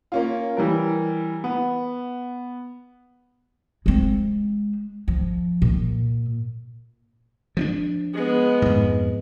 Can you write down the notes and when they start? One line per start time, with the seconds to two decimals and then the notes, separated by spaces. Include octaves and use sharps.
0.12 A#3 C#4 F4
0.57 E3 G3 A#4
1.44 B3
3.86 G#3 C4
5.08 F3
5.62 A#2
7.57 F3 C4 D4
8.13 G#3 B3
8.62 F2 G#2